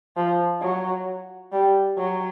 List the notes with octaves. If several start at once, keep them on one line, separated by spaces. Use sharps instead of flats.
F3
F#3
G3
F#3